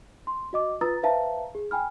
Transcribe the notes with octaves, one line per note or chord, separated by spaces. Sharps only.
C6
F#4 D#5 D6
F4 B4 A#5 D#6 E6 A6
B4 C5 E5 F5 A5 A#5
G#4
G5 G#5 B5 F6